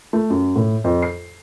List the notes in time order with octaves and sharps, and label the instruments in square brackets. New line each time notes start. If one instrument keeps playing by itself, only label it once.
[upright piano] A3
F#2
A2
F2
C7